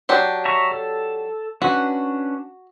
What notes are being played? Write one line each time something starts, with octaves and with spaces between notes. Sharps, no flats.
F#3 D4 G4
E5 A#5 C#6
A4
C#4 D4 F#4 B4